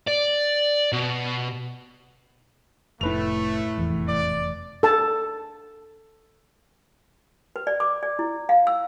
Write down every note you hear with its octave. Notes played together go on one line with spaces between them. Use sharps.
D5
B2
F1 A2 A3 B4 F7
F1 E2
D5
A4 A5
B4
D5
D6
D5
E4
F5
E6